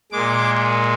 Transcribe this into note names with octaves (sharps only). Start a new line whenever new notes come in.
A#2 G#3 D6